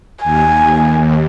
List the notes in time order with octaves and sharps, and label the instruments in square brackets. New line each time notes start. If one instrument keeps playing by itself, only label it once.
[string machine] D#2 [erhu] G#5